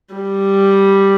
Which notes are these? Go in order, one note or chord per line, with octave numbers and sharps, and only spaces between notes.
G3